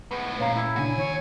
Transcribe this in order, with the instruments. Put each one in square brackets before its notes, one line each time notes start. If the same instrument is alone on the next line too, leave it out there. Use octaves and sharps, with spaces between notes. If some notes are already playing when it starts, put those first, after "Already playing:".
[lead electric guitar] A2 G#3 [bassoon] B3
[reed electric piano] A#2 A#5 [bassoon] C#4 [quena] F5
[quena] E4
[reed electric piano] A#2 C#3 D4 [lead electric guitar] F#4 G#5
[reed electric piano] D#3 [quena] C#5